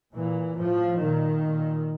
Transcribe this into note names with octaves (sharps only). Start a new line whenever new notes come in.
A#2 E3
A2 F3
A#2 D#3
A#2